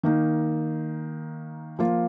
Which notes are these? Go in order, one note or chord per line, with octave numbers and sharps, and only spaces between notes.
D#3 A#3 D#4
F3 A#3 F4